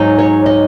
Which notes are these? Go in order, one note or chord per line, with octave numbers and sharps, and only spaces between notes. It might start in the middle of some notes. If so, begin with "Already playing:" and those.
Already playing: G#2 F#3 D#4
C#5
D#5